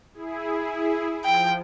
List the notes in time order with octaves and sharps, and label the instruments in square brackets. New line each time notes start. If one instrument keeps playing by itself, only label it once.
[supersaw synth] E4 G#4
[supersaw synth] F3 [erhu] G5